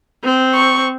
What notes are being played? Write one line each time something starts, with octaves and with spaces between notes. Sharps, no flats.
C4
C#6